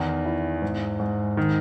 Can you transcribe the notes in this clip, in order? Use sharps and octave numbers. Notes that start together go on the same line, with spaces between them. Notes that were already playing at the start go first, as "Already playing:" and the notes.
Already playing: E2 D#3
E4
G#2
G#2
D#3